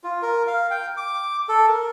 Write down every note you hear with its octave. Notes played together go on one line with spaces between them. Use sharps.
F4
A#4
F5
G5
D6
A4
A#4